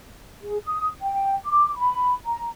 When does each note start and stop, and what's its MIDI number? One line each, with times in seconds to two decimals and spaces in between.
0.43 0.56 68
0.65 0.88 87
1.02 1.34 79
1.46 1.75 86
1.76 2.14 83
2.26 2.47 82